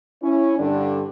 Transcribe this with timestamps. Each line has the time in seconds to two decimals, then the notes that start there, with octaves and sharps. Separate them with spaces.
0.23 C#4 E4
0.58 G2 D3 D4